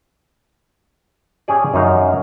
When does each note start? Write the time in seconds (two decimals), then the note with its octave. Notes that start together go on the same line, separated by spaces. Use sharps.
1.48 C#4 G4 G#4 D5
1.74 F#2 D#4 F5